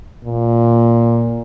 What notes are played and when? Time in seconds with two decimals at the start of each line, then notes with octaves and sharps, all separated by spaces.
0.24 A#2